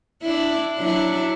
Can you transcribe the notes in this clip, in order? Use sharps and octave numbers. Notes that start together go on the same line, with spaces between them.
D4 E4
F#3 D4 E4